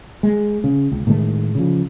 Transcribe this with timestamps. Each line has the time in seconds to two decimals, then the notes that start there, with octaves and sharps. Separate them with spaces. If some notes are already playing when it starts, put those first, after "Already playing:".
0.23 G#3
0.64 C#3
0.92 C#2
1.07 A2 D#3 G#3 A3
1.55 C#3 F3